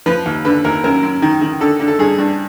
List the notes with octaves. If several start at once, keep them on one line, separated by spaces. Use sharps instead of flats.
F3 B4
D#2
D3 B4
D#2 A#4
F#2 A#4
F#2
D#3
D#3
D3 A4
D3
A4
G2 G#4
G2